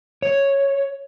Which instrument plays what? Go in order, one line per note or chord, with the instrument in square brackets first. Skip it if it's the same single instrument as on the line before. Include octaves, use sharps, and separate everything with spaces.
[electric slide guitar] C#5